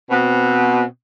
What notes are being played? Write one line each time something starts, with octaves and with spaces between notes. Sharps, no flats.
B2 C4